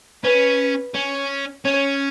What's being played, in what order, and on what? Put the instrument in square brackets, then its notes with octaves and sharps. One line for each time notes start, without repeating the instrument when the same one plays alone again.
[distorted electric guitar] C#4 [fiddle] B4
[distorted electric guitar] C#4
[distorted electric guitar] C#4 [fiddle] C#5